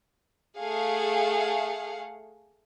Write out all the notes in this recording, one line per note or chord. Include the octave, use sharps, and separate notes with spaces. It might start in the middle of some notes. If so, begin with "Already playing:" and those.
A3 G#4 F5 F#5